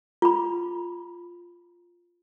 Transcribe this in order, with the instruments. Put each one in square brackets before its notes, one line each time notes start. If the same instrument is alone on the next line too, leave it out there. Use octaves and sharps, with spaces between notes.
[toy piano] F4 B5